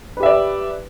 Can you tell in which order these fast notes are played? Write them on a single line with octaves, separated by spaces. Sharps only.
B4 G4 E5 D5